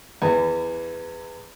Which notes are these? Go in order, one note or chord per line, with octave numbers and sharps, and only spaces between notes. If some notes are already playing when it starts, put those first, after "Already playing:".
E2 E3